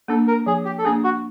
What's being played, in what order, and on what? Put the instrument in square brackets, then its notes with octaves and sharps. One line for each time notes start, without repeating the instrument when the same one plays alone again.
[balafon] A#3 D4 [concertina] A4
[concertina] A#4
[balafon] F3 [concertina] G#4
[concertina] G4
A4
[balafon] A#3 D4 [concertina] G#4
[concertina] F#4